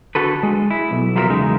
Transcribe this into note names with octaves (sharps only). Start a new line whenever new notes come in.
D3 F#4 A4 B4
G#3
E4
B1
F#3 E4 F4 G#4 A#4 E5
E2 C#3 G#3 D#4